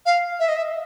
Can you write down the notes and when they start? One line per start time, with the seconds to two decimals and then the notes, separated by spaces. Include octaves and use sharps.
0.06 F5
0.39 E5
0.48 D#5
0.56 E5